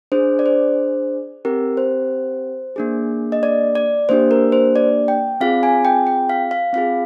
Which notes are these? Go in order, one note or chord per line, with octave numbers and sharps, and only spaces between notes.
D4 G#4 C5
D5
C5
C4 G4 A#4
C5
A#3 D4 G#4
D#5
D5
D5
A#3 D4 G4 C5
A#4
C5
D5
G5
C4 F4 G#4 F5
G#5
G5
G5
F5
F5
C4 F4 G#4 F5